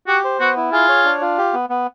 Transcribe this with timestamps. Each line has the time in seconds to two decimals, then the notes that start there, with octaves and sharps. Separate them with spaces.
0.08 F#4 G4
0.24 C5
0.40 B3 F#4
0.57 E4
0.72 F4 G#4
0.89 C#5
1.04 D4
1.21 F4
1.38 G4
1.53 B3
1.70 B3